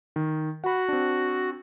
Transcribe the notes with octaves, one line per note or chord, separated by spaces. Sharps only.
D#3
F#4 F#5 B5
C4 D4